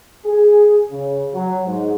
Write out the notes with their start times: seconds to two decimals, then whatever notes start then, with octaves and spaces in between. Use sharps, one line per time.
0.25 G#4
0.89 C#3
1.34 F#3
1.65 G#2